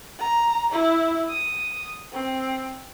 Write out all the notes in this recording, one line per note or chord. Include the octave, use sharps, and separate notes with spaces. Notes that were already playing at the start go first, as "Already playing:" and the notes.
A#5
E4
D#6
C4